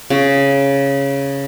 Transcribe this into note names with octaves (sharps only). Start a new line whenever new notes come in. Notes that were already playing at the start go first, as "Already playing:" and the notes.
C#3